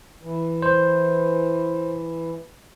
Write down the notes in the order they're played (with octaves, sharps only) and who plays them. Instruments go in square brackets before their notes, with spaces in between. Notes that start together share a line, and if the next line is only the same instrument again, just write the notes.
[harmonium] E3
[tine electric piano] C5